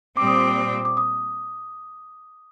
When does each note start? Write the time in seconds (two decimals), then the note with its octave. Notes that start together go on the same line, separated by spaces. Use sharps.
0.17 A#2 G3 C4 D6
0.27 D#6
0.36 D6
0.85 D6
0.97 D#6